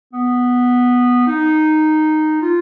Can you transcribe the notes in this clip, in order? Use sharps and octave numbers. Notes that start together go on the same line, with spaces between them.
B3
D#4
F4